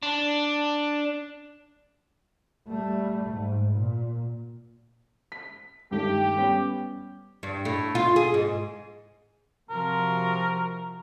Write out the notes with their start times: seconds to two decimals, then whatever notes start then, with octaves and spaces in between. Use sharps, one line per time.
0.03 D4
2.68 G3 A3
3.30 G#2
3.74 A#2
5.32 B6
5.91 G2 D#3 A3 G4
6.37 G3 B3 C#4
7.43 G2
7.65 A2
7.95 F4
8.16 G#4
8.34 G#2
9.70 C3 F3 F#4 A#4